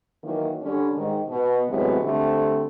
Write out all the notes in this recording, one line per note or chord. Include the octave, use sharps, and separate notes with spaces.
D#3 E3 F#3 A#3
D3 G3 C#4
G#2 D#3
B2
A2 C3 E3 F#3 G#3 B3
D3 G3 A3 C4